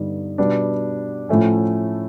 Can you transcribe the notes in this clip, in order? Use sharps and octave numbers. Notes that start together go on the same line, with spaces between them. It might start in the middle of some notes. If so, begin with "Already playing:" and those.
Already playing: G2 D3 G3 B3 D#4
B2 G3 B3 D4
A2 F3 A3 C#4